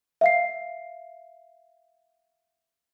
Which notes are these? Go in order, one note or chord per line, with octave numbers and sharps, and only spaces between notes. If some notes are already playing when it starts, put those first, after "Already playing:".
E5 F5 C7